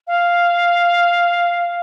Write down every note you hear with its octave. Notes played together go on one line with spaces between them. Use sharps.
F5